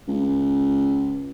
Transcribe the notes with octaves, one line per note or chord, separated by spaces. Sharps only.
C#2